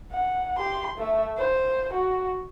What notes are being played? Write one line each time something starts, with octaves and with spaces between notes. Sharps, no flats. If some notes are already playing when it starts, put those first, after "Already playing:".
F#5
G4 C6
A3 E5
C5
F#4